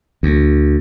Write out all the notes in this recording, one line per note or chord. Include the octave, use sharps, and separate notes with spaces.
D2